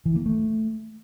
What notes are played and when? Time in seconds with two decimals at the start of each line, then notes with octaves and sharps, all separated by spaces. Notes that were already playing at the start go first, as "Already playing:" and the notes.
0.06 E3
0.16 A#3
0.26 A3